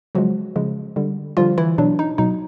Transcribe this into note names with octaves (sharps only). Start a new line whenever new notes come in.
C#3 F3 F#3 G#3 F#4
C#3 F3 G#3
D3 G3
D3 F3 G3 F4
E3 E4
B2 F#3 D4
D#4
B2 F#3 D#4